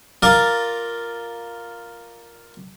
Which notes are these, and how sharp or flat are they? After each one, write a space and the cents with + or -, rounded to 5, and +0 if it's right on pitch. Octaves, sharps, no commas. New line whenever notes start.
F4 +0 A#4 +0 D5 +0